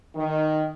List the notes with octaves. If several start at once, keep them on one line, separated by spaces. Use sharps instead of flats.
D#3